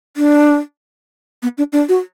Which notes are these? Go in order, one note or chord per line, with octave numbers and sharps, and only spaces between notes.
D4
B3
D4
D4
F#4